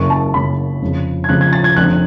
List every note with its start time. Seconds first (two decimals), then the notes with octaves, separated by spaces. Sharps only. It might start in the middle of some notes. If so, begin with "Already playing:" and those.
Already playing: F#1 F#2 C#3 C#6
0.10 A5
0.34 F#1 F#2 C#3 B5
0.81 F1 F2 C#3
1.24 G#6
1.29 F1 F2 C#3 F#6
1.41 G#6
1.53 A6
1.64 G#6
1.76 F1 F2 D3 F#6